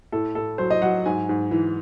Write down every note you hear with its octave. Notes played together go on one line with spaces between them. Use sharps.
A2 A4
A2 A4
F#3 C5
D#5
F#3 F#5
G#2 G#5
G#2
E3